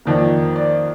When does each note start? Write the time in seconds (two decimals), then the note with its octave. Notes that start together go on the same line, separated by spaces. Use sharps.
0.05 F2 D#3 A#3 D5
0.56 D5